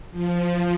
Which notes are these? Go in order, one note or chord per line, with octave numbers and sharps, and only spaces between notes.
F3